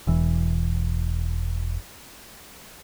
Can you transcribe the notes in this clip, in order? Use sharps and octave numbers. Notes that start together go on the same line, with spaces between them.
E1 E3